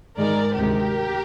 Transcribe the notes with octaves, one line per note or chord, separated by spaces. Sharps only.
G#2 D#3 G#3 A#4 D5
D2 C3 D#3 G#3 G4 A#4